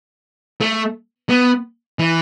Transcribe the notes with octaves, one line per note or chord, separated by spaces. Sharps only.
A3
B3
E3